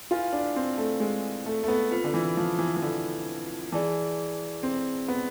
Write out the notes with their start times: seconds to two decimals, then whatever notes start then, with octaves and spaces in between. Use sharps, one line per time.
0.11 E4 F4 B4 F5 G#5
0.33 D4
0.56 C4
0.78 A3
1.00 G#3
1.46 A3
1.64 A3
1.68 B3
1.91 C4 F4 B4
2.04 D3
2.14 E3
2.37 F3
2.59 E3
2.77 E3
2.82 D3
3.72 E3 G#4 D5 A5
4.63 C4
5.08 B3